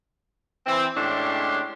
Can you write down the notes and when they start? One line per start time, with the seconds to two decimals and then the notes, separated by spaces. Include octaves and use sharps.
0.66 E3 C4
0.97 A2 G#3 C#4 D4 G4 C6